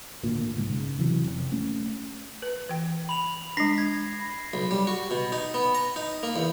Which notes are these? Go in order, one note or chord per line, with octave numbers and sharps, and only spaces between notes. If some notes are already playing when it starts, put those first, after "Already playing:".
G#1 D2 A#2
F#1 B1 G#2
C#3
C3 E3 F#3
F1
A3 C#4
B4
E3 G5
B5 F7
G#3 D4 A#6 C7
G#6
B1
G3
F#4
B2
D#4
B3
A#5
D#4
A#3
E2